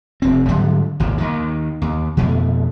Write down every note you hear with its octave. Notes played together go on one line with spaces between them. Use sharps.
F1 C4
G#2 D3 F#3 G3
G#1 D#2 A#2
D#2 D#3
D#2
F2 B2 A3